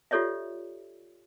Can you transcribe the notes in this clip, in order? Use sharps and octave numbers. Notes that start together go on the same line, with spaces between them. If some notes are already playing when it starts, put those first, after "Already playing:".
F4 G4 A4 C#5 D5 E5